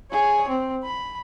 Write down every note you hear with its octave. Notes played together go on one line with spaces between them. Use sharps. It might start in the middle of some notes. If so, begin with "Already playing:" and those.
G#4 C#5
C4
B5